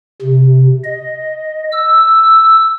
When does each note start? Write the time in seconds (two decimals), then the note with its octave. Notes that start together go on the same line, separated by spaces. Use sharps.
0.22 C3
0.84 D#5
1.72 E6